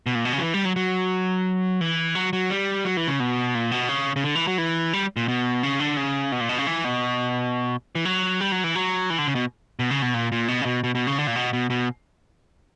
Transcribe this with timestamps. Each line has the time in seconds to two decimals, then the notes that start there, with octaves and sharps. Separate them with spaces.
0.06 B2
0.15 A#2
0.25 B2
0.33 C#3
0.38 F#3
0.41 E3
0.54 G3
0.65 F#3
0.76 F#3
1.81 E3
2.15 F#3
2.33 F#3
2.50 G3
2.85 F#3
2.97 E3
3.08 C#3
3.20 B2
3.55 A#2
3.71 B2
3.89 C#3
4.16 C#3
4.24 D3
4.35 E3
4.47 F#3
4.58 E3
4.93 G3
5.16 A#2
5.28 B2
5.63 C#3
5.80 D3
5.97 C#3
6.32 B2
6.41 A#2
6.49 B2
6.58 C#3
6.67 E3
6.84 B2
7.95 E3
8.05 F#3
8.41 G3
8.52 F#3
8.64 E3
8.75 F#3
9.10 E3
9.19 D3
9.28 C#3
9.35 B2
9.79 B2
9.91 C#3
10.02 B2
10.14 A#2
10.32 A#2
10.48 B2
10.61 C#3
10.66 B2
10.84 B2
10.95 B2
11.07 C#3
11.18 D3
11.27 A#2
11.36 B2
11.53 B2
11.70 B2